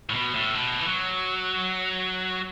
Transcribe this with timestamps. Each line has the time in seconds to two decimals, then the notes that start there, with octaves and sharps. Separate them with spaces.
0.10 A2
0.15 B2
0.35 A2
0.55 B2
0.81 E3
0.86 F#3